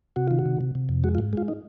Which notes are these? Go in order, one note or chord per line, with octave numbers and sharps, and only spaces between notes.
C3 F#4
D#3 F4
F#4
C3
C3
C3
F2
G#3 F#4
F4
G#2
G#3 F4
D#4